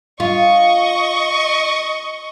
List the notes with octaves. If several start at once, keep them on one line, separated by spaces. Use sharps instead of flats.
F4 D#5 C#6